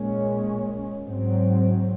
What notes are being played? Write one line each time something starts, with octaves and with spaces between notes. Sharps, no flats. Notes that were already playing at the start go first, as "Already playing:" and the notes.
Already playing: A#2 G#3 C#4
G#2 F#3 C4